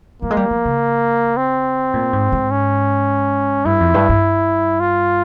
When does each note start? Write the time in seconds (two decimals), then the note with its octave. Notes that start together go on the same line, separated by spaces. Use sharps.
0.22 G3 A#3
0.31 G#3
0.37 G3
0.51 F3
0.65 C#3
1.37 C4
1.94 A#2
2.13 G#2
2.32 G#2
2.51 C#4
3.65 G2 E4
3.80 F2
3.94 G2
4.09 G2
4.81 F4